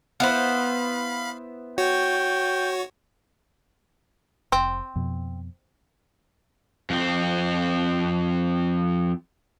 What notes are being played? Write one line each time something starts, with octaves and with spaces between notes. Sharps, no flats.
B3 E4 C5 F5 B5
F#4 C#5 G5
F1 C4
F2 B2
F2 C4